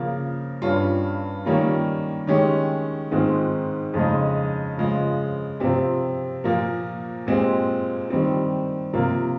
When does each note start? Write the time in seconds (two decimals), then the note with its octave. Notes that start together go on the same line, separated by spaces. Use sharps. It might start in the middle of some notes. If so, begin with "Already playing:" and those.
Already playing: C#3 F3 A#3
0.62 G2 G3 C#4 F4
1.45 D#3 G3 A#3 C#4 F4
2.27 D#3 G#3 C#4 G4
3.11 G#2 D#3 G#3 C4 F4
3.94 F2 C#3 G#3 D#4
4.78 C#3 F3 G#3
5.60 C3 F3 C4 G4
6.44 A#2 F3 A#3
7.27 A#2 G#3 C4 G4
8.10 D#3 G3 C4
8.93 C3 F3 A#3 F4